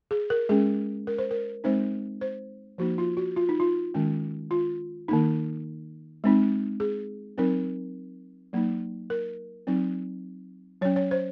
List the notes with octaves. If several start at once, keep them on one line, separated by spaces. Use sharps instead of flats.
G#4
A#4
G#3 C#4 G#4
A#4
C5
A#4
G#3 C4 D#4 C5
C5
F3 A#3 D#4 F#4
F4
F#4
F4
D#4
F4
D#3 G#3 C#4
F4
D#3 A#3 D#4
G#3 C4 D#4
G#4
F#3 C4 D#4 A#4
F#3 A#3 D#4
A#4
F#3 C4 D#4
F#3 C#4 C#5
C#5
C5